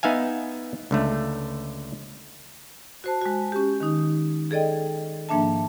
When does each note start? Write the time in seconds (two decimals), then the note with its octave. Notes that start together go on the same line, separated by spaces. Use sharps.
0.03 B3 D#4 E5 F5 G#5
0.91 C#2 D3 A3
3.04 F#4 C5 A5
3.21 G#3 F#4
3.52 C#4 G4
3.81 D#3 D#4
4.51 G#4 A4 D5 D#5 G5
5.29 G#2 F3 A#3 D4 E5 A5